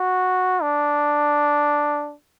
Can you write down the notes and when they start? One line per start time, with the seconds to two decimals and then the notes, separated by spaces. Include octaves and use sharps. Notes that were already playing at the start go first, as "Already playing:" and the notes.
Already playing: F#4
0.62 D4